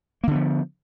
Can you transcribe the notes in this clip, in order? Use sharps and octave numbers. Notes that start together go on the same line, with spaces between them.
D3 F3 A#3 B3